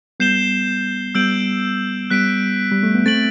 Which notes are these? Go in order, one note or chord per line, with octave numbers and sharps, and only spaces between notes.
G3 B3 G6 C7 E7 G7
G3 B3 E6 G6 D7 F#7
G3 B3 F#6 B6 D7
G3
A3
B3
A3 C4 A6 D7 F#7